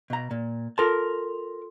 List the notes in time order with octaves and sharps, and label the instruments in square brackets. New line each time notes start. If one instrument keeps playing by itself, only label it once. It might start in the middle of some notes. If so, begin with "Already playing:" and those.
[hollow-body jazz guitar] B2 A#5
A#2
[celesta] F4 A4 C6 [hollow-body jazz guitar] A#4 A5